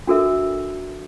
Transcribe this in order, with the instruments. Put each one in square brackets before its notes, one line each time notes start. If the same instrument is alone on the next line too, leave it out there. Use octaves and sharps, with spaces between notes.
[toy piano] D4 F#4 A4 A#4 E5